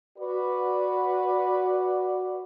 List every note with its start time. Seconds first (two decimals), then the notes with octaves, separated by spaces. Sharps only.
0.19 F#4 B4 D5